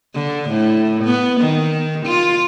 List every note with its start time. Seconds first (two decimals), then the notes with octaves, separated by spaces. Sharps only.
0.14 D3
0.50 A2
1.04 B3
1.41 D#3
2.06 F4